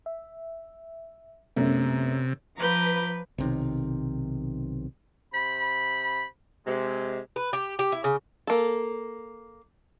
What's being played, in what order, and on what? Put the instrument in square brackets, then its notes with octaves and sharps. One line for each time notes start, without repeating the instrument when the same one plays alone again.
[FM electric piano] E5
[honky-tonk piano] F#2 [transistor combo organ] C3 [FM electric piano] A3 B3
[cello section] F3 B4 [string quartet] A#5 D6 G6
[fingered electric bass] B1 C3 D#3
[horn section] C3 C5 B5
C3 G#3
[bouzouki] B4
G4
G4
E4
C#3
[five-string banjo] A#3 A4